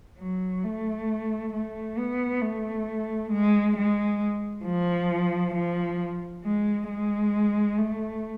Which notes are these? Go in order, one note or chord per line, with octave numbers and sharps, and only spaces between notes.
F#3
A3
A3
B3
A3
G#3
G#3
F3
F3
G#3
G#3
A3